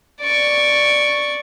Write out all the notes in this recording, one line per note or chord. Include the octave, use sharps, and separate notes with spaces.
D5 C#6